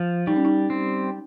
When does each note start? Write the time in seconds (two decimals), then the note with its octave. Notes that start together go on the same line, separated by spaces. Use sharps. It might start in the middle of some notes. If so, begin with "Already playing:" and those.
Already playing: F3
0.27 G3 D#4
0.36 C#4
0.45 D#4
0.70 C4